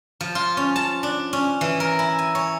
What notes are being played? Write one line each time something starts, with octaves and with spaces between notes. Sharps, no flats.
F3
F4
C#4
A5
D4
C#4
E3
A#4
E4
G#5
C#5